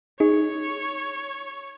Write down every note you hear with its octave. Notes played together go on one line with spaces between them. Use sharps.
D#4 G#4 C#5